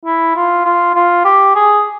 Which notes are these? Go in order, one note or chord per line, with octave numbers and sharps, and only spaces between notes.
E4
F4
F4
F4
G4
G#4